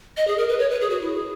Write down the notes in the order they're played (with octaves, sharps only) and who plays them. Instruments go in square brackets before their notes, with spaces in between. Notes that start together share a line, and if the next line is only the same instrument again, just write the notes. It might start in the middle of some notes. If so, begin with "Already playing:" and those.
[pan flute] D#5
G#4
A#4
B4
C#5
B4
G#4
F#4
E4
G#4